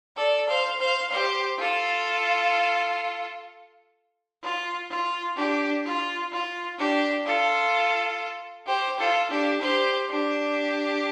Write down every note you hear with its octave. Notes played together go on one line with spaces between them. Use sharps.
A4 D5
C5 F5
C5 F5
G4 C5
F4 A4
F4
F4
D4 G4
F4
F4
D4 G4
F4 A4
G4 C5
F4 A4
D4 G4
G4 C5
D4 G4